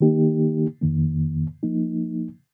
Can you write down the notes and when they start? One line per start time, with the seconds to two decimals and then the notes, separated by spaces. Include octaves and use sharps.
0.01 D#3 A#3 D#4 G4
0.82 F2 D#3 A#3
1.63 F3 A#3 D#4